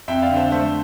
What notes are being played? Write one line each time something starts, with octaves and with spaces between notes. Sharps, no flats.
F2 E5 G5
D5 F5
D3
C5 E5
A3 C5 E5